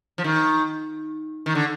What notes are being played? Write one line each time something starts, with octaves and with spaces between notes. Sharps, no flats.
F3
D#3
D#3
D3